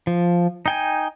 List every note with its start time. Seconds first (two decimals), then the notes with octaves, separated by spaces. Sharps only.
0.07 F3
0.66 D#4 G5 G#5